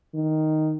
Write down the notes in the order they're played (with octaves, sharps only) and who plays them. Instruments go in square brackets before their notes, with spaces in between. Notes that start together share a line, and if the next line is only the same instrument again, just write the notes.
[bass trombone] D#3